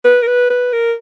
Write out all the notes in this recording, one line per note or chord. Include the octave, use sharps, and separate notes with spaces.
B4
A#4
B4
B4
A#4